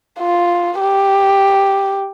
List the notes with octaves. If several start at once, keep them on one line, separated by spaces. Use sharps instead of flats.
F4
G4